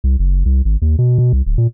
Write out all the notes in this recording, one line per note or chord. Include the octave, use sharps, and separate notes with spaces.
C2
F#1
C2
G#1
D#2
B2
B2
C2
D1
A#2